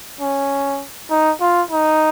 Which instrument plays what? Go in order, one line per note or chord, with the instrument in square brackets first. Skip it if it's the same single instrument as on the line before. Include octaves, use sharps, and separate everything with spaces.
[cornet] C#4
D#4
F4
D#4